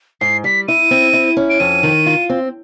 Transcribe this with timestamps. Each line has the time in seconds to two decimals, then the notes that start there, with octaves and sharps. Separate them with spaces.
0.21 G#2 C7
0.44 G3 B6
0.68 E4 D#7
0.91 C4
1.13 E4
1.37 C#4
1.50 D7
1.60 F2 D#7
1.83 D#3
2.06 F4
2.29 C4